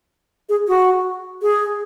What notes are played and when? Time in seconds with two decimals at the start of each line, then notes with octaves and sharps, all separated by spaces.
0.49 G#4
0.68 F#4
1.42 G#4